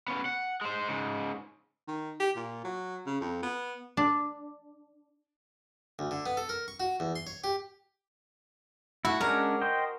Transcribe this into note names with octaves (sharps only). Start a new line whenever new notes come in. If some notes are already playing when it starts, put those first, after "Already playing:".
B3 C#4
F#5
G#3 C5
G#2 C#3
D#3
G4
A#2
F#3
C#3
F2
B3
D4
D2
D3
B3
A4
A#4
C#6
F#4
E2
C6
C#5
G4
A3 E4 F#4
G#3 C#4 D4 A#4
C5 D#5 G5